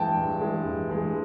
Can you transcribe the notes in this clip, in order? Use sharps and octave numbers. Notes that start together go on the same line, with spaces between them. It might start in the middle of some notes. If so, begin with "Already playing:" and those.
Already playing: G2 E3 G#3 G5 A5
G2
E3 G#3
G2
E3 G#3